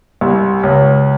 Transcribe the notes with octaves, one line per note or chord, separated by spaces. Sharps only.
C2
C#2